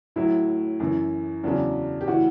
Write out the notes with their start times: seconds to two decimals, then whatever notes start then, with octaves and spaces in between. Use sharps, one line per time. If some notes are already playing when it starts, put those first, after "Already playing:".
0.16 A2 F#3 E4
0.80 F#2 E3
1.44 E2 C#3 F#3 D4
2.01 G4
2.07 A2 E3 F#4